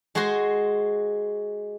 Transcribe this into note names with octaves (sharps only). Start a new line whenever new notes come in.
G#3 F#4 G#4 C5 C6